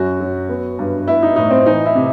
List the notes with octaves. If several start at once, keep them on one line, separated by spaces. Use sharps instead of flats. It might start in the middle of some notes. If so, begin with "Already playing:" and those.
Already playing: F#2 F#4
F#3
B3
G2
B3 E4
D#4
A2 D#4
C4
E3 D#4
E4
C3